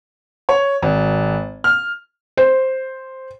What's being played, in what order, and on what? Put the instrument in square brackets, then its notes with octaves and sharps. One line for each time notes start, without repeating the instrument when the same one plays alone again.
[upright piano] C#5
G#1
F6
[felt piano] C5